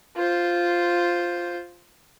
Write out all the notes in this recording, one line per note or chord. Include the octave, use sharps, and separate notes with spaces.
F4 C5